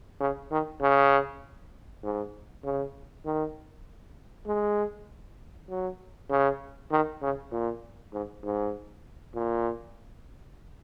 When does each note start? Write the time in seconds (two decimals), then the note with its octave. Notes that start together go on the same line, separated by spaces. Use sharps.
0.20 C#3
0.51 D#3
0.81 C#3
2.04 G#2
2.64 C#3
3.25 D#3
4.47 G#3
5.70 F#3
6.30 C#3
6.91 D#3
7.22 C#3
7.52 A#2
8.13 G#2
8.44 G#2
9.35 A#2